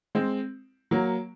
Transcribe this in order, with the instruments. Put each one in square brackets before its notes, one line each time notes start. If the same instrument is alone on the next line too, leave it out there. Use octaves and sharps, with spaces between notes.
[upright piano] G#3 C4
F#3 A#3